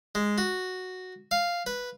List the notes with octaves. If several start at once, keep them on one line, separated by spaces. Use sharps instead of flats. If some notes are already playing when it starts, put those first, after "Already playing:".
G#3
F#4
F5
B4